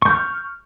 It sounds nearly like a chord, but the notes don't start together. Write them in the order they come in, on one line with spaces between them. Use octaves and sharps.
C#6 G6 F6